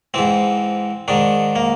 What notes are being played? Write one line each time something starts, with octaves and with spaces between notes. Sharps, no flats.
G#2 E3 C4
G#2 D#3 D4
A#3